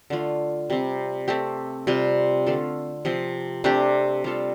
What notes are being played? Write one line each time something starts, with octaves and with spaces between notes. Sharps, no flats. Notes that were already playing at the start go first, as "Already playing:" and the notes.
D3 A3 F4
C3 G3 C4
A3 C4 G4
C3 G3 F4
D3 A3 F4 A4
C3 F3 C4
C3 A3 D4 G4
G3 F4 A4